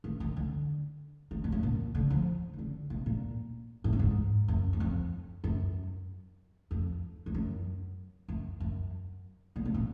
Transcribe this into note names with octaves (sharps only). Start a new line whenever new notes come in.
D#3
D#3
D3
D#3
G#2
F#2
A#2
D3
F3
D#3
D3
B2
A#2
G#2
A#2
G#2
F#2
F#2
F2
F#2
F2
F2
F#2
F#2
F#2
A#2
B2
A#2